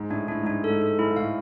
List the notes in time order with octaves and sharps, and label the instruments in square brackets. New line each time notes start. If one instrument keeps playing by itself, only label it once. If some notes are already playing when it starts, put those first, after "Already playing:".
Already playing: [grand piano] G#2
[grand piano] A2 [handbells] D4
[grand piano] A2 [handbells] D4
[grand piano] G#2 [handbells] D4
[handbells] A4
[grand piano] G#2
[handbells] A4
[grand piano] G#2 [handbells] E4
[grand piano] G#2
[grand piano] A2 [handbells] F5